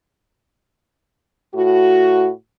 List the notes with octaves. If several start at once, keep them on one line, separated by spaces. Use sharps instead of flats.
A2 F#4